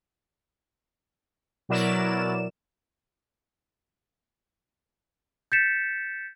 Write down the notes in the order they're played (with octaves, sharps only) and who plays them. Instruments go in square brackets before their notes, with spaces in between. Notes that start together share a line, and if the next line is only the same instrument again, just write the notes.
[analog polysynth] B2 F#3 E4 A#4 D5 E7
[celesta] G6 A6 B6 C#7 E7